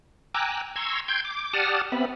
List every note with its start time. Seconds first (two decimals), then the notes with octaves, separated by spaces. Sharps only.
0.34 G5 G#5 A#5 D6 E6 F#6
0.76 A#5 C6 C#6 E6 G#6
1.08 G5 C6 G6 G#6
1.25 D6
1.53 G4 D5 F#5 A5 D#6 F6
1.92 B3 C4 E5 B5